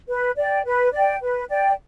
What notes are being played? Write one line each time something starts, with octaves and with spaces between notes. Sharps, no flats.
B4
D5 G5
B4
D5 G5
B4
D5 G5